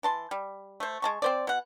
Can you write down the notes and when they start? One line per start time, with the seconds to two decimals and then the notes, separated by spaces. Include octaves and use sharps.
0.03 E3 A5 C6
0.31 G3
0.80 A3 C5
1.02 G#3 A5 C#6
1.22 C4 C5 D5
1.47 B2 F#5